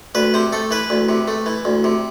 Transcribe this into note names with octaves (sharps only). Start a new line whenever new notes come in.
D2 B4
C3 C5
A3 A4
E3 B4
D2
C3
A3
E3
D2
C3